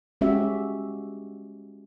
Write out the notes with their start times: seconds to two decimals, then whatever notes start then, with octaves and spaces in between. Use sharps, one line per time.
0.21 G#3 C#4 F#4 G4 E5